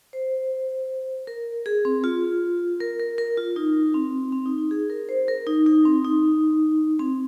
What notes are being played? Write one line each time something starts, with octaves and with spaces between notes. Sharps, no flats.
C5
A#4
G#4
C4
F4
A#4
A#4
A#4
F4
D#4
C4
C4
D#4
D#4
G#4
A#4
C5
A#4
D#4
D#4
C4
D#4
C4